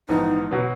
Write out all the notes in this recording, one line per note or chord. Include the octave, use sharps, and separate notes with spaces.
A#1 G#2 E3 B3 D#4
B2 F#3 B3